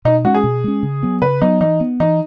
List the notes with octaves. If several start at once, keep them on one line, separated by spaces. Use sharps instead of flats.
B2 D#4
G#3 C#4 F#4
G#4
B2
G#3 C#4
C#3
F#3 B3
C#3 B4
F#3 B3 D#4
E3 D#4
B3
E3 D#4